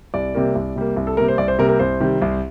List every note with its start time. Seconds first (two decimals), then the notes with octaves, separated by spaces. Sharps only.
0.14 C2 D5
0.35 C3 G3 A#3
0.55 C2
0.76 C3 G3 A#3
0.96 C2
1.07 A4
1.17 C3 G3 A#3 A#4
1.28 C5
1.38 C2 D5
1.48 C5
1.58 C3 G3 A#3 A#4
1.69 A#4
1.79 C2 C5
2.00 C3 D#3 G3
2.22 C2